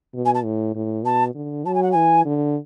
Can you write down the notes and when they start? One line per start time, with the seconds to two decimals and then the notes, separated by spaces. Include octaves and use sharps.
0.15 B2
0.25 G#5
0.34 A5
0.45 A2
0.75 A2
1.04 B2 A5
1.35 D3
1.65 F#3 A5
1.74 G#5
1.83 F#5
1.92 E3 G#5
2.25 D3